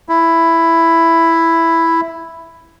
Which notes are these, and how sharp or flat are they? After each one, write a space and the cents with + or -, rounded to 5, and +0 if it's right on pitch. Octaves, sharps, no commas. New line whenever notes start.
E4 +5